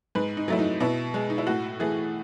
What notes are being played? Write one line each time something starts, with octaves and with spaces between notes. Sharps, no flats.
G#2 B4
D#4
F#3 A3 E4
D#4
B2 E4
G#3
D#4
E4
A2 F#4
E3 A3 G#4